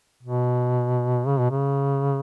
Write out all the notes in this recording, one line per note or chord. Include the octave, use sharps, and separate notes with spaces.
B2
C#3
B2
C#3